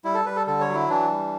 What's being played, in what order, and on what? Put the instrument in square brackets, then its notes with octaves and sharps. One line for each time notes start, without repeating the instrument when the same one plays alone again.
[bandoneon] G3 E4
A4
G3 B4
A4
D3 A4
C#5
F#3
E4
E3 D4
G3